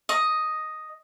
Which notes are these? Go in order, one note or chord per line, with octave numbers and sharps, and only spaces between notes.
D#5